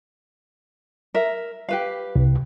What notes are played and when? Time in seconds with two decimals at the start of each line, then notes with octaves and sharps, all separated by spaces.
1.14 A#4 E5
1.69 G4 B4 F5
2.16 C2